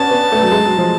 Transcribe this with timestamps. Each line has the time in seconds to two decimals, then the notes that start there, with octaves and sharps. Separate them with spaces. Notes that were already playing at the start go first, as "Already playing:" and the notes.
Already playing: B3 C#4 D4 A5
0.11 B3
0.32 A3
0.42 F#3
0.51 G#3
0.65 F#3
0.78 F3